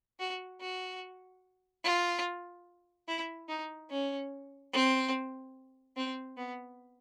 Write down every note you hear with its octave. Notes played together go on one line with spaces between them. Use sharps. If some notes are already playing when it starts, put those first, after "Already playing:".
F#4
F#4
F4
E4
D#4
C#4
C4
C4
B3